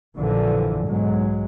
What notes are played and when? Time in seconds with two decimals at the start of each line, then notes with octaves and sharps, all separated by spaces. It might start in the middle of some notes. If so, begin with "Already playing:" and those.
0.17 A#1 F#2 A#2 D3 E3 F3
0.87 B1 G#2 F#3 G#3